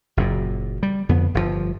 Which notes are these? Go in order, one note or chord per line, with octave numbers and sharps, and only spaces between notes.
F#1 F#2 A#2
G3
F2 D3 B3
G1 G2 C3 F3